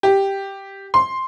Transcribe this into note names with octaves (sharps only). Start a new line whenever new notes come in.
G4
C6